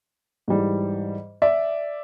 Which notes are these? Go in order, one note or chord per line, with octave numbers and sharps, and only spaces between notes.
G#2 E3 G3
D5 E5